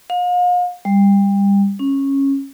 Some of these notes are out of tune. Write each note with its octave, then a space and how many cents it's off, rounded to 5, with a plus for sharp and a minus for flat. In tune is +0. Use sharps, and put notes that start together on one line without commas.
F5 +40
G3 +25
C#4 -15